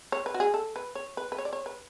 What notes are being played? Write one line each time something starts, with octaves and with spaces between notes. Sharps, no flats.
C#5
B4
F#4
G#4
A4
B4
C#5
B4
B4
C#5
D5
C#5
B4